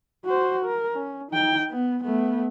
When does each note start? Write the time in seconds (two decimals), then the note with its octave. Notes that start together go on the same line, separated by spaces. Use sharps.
0.25 F#4 C5
0.65 A#4
0.94 C#4
1.31 D#4 G5
1.70 B3
2.04 A3 B3